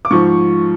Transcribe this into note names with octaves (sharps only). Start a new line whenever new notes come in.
D6
G#2 F3 C#6